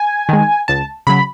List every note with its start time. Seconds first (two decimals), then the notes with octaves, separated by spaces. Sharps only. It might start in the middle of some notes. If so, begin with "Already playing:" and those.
Already playing: G#5
0.29 D#3 G#3
0.68 C#2 A5
1.07 C#3 F#3 B5